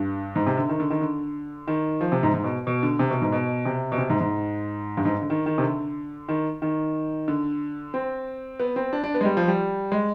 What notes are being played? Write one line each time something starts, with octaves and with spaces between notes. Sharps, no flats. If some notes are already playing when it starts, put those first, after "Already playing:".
Already playing: G2
G#2
C3
D3
D#3
D3
D#3
D3
D#3
F3
C3
G#2
G#2
B2
B2
D3
C3
B2
G#2
B2
C3
B2
C3
G#2
G#2
G2
G#2
D3
D#3
D#3
C3
D3
D#3
D#3
D3
C4
B3
C4
D4
D4
B3
G#3
G3
F3
G3
G#3